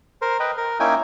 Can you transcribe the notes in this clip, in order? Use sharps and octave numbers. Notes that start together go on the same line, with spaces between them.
A#4 C5
B4 D#5 G5
A#4
A#3 C#4 D#4 E4 G5 G#5